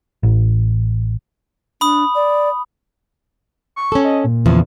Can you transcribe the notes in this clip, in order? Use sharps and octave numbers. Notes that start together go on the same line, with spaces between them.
A1
D4 B5 D#6
D5
C#6
C#4 A4
D#5
A#2
E2 C#3 F3